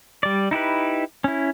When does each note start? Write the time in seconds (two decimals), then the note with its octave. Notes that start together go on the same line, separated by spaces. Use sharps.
0.23 G3 D5
0.51 D#4 E4 G4 B4
1.24 C#4 E4